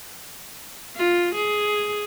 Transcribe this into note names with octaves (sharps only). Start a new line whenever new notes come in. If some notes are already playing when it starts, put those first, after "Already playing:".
F4
G#4